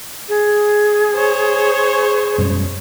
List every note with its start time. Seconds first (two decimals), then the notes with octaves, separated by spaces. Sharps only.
0.29 G#4
1.15 C5 C#5
2.38 F#2 B2 G3